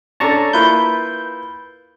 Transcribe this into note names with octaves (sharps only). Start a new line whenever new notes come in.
C#4 D4 A4 A5 A#5 C#6
A#3 E4 F4 B4 G6